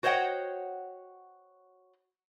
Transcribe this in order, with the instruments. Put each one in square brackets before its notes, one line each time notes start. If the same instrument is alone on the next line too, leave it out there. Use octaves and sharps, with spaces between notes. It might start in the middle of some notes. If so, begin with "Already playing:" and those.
[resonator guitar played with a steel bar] F#4 C5 C#5 D#5 F#5 G5